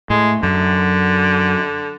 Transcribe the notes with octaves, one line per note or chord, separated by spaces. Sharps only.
A2 G#3
F#2 D3